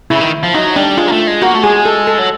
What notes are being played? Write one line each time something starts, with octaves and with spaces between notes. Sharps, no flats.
C#3 E4
D#3
F3
F#3 D#4
G3 D4
G#3 F4
A#3
A3
G#3
A#3 F#4
A3
G#3 G#4
A4
A4
F#3